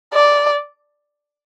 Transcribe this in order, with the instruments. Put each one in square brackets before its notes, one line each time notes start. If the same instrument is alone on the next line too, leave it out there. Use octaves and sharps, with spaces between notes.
[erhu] D5